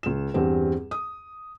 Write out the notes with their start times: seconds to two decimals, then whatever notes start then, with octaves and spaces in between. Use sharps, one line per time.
0.03 C#2 E7
0.34 E2 G2 G3 C4
0.91 D#6